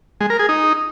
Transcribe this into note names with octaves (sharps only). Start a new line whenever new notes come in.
G#3
A#4
G#4
D#4